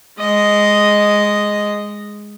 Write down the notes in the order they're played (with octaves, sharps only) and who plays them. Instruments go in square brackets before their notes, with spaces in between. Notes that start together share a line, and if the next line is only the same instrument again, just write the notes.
[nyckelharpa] G#3 D#5